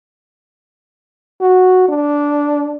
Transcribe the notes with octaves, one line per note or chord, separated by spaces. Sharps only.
F#4
D4